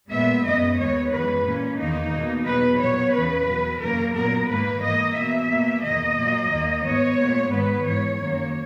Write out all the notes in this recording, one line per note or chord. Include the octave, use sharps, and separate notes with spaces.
A#2 G#3 B3 E5
F#2 C#3 G#3 B3 D#5
D#2 D#3 G#3 B3 C#5
F#2 E3 G#3 B3 B4
A#2 A#3 C#4
E2 D#3 A#3 D#4
B2 A#3
E2 B2 F#3 B4
A#2 F#3 B3 C#5
E2 C#3 E3 B4
E2 B2 F#3
F#2 C#3 E3 A#3 A#4
A#2 F#3 B3 A#4
G#2 D#3 A#3 B4
G#2 E3 A#3 D#5
B2 A#3 E5
B2 A#3
E2 D#3 A#3 D#5
A#2 F#3 A#3
D#2 D#3 A#3
G#2 E3 B3 C#5
A#2 G#3 B3
G#2 D#3 G#3 B3 B4
G#2 E3 G#3 C#5
F#2 D#3 A#3